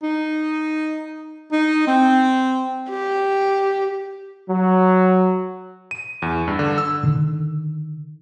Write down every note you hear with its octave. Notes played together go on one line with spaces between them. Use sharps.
D#4
D#4
C4
G4
F#3
D#7
E2
G2
D3
E6
D3 D#3